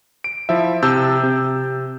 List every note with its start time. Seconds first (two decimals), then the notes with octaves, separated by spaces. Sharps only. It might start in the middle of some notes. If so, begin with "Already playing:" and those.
0.24 D7
0.49 F3 E4 E5
0.83 C3 A5 E6 G6
1.23 C3